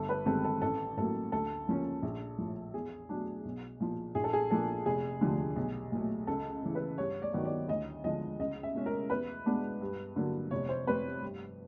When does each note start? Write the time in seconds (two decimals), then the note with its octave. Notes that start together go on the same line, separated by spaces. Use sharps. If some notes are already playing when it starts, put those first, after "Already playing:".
Already playing: G1 A4
0.09 B4
0.26 G2 D#3 G#3 C4 A4
0.45 A4
0.62 A1 A4
0.97 A2 F#3 A#3 A4
1.32 D2 A4
1.67 C#3 F3 A#3 C#4
2.02 A#1
2.38 A2 F3
2.74 E2 G#4
3.09 B2 F#3 A3 D4
3.45 B1
3.80 A#2 F3
4.15 A#1 G#4
4.24 A4
4.33 G#4
4.51 A#2 F3 A#3 D4 A4
4.86 F1 G#4
5.21 D#2 D3 F3 A3
5.56 B1
5.92 A#2 F#3 A3
6.27 C#2 A4
6.62 C#3 E3
6.75 B4
6.98 G2 C#5
7.22 D5
7.33 D#3 F#3 B3 D#4
7.45 D5
7.68 D2 D#5
8.04 D3 F3 G#3 D#5
8.40 C#2 D#5
8.63 E5
8.74 B2 G#3 C#4
8.86 A#4
9.10 E2 B4
9.46 B2 G#3 B3 D4
9.81 G2
10.16 D3 F#3 A#3
10.51 F1 C#5
10.69 C5
10.87 F2 C3 B4
11.22 G2